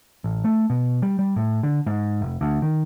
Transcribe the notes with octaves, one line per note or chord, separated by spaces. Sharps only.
A1
A3
B2
G3
G3
A2
D3
G#2
F1
D2
D#3